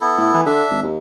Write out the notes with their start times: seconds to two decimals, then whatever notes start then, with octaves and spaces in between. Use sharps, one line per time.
0.01 B3 E4 A4
0.18 A2
0.34 E3
0.46 D3 D4 E5
0.70 G#1
0.83 D#2